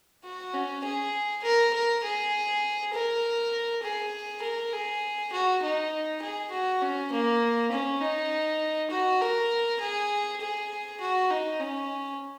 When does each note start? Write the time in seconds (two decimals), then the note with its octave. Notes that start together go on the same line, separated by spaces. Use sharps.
0.24 F#4
0.53 C#4
0.84 G#4
1.43 A#4
1.73 A#4
2.04 G#4
2.93 A#4
3.83 G#4
4.43 A#4
4.73 G#4
5.32 F#4
5.63 D#4
6.22 G#4
6.52 F#4
6.81 C#4
7.12 A#3
7.72 C#4
8.01 D#4
8.90 F#4
9.21 A#4
9.81 G#4
10.41 G#4
11.00 F#4
11.30 D#4
11.60 C#4